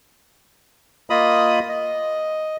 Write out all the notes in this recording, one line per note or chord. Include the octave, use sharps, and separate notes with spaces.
A#3 F4 D#5 B5 D#6
D#5